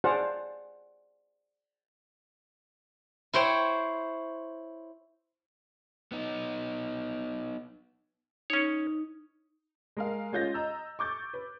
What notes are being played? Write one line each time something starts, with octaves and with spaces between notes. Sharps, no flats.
G#4 C5 D5 F5 F#5 A5
E4 C5 C#5 G5
B3 D#4
C#4 D#4 C#5
G#3 A#4 F5
G#3 C#4 F4 G6 A6 A#6
D#5 A#5 E6
C#6 D6 G6 A6
B4